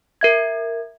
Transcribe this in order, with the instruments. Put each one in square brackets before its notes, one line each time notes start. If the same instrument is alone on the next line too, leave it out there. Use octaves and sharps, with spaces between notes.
[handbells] A#4 E5 G#6